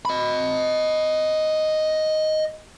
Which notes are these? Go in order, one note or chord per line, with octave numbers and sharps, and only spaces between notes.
D#5 B5